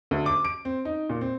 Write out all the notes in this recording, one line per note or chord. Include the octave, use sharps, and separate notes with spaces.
D2
D6
D7
C4
D#4
A#2
C4